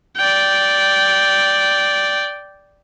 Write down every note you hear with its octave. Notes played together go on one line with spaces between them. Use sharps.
D5 G5